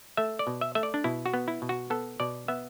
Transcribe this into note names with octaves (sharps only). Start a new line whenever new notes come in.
A3 E5
D5
B2
E5
A3 E5
D5
D4
B2 E4
F#4
B3
E4
B2
F#4
B3 A4
B2 D5
B3 E5